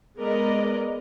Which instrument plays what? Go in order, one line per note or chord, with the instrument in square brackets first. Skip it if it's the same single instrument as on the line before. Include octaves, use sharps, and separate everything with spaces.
[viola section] G#3 B3 A#4 D5 D#5